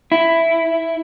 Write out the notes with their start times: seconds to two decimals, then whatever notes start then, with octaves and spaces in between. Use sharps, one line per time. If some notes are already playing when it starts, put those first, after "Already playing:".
0.12 E4